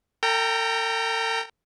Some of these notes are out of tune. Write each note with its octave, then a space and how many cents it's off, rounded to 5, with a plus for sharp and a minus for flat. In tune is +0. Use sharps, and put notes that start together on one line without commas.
A4 +45 G5 +0 A#5 +0